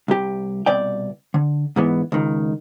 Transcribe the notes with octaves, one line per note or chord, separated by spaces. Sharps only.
C2 G4
C2 B2 D5 G5
D3
G#2 E3 B3
C#2 D#3